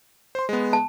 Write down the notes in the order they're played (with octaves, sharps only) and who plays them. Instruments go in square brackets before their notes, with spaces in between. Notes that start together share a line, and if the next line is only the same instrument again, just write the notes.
[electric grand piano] C5 C6
G#3 B3
[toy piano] A5